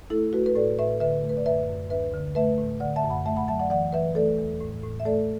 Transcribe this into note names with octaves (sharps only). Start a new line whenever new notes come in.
A3 E4 A4
A3 F#4 B4
B4
A2 A4 D5
A2 B4 E5
D3 B4 E5
A3
B4
D5
F#2 B4 E5
F#2
D2 B4 E5
D3
A3 B4 E5
A2
D3 D5 F#5
E5 A5
F#2
F#5 B5
A3 E5 A5
F#5 B5
F#3 E5 A5
D5 F#5
E3 D5 F#5
E3 B4 E5
A3 A4 D5
E2
A2
A2
E5
A3 A4 D5